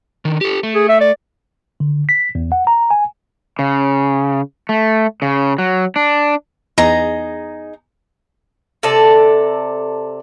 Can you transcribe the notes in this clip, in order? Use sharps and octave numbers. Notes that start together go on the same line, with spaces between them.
D3 D#3
G4 A4
A3
G#4
E5
D5
D3
B6
E2
F#5
A#5
G#5
C#3
A3
C#3
F#3
D4
E2 D#4 G#4 A#5
C3 A4 D5